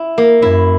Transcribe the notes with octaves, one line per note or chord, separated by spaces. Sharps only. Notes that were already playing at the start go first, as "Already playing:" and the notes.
Already playing: E4
A#3
F#2 E4